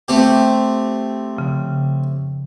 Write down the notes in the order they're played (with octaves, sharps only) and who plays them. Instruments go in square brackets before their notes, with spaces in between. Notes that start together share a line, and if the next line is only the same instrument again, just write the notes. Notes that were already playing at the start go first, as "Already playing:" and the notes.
[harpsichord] A3 C4 G4
[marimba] C#3 F3